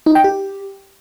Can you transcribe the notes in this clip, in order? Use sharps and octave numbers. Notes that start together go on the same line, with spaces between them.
D#4
G5
G4